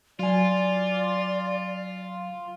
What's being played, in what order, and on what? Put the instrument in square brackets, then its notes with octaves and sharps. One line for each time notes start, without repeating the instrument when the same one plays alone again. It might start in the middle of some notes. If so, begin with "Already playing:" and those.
[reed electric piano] F#3 G#5 [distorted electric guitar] F4 [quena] D5